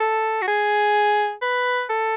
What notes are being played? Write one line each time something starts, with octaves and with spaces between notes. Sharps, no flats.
A4
F#4
G#4
B4
A4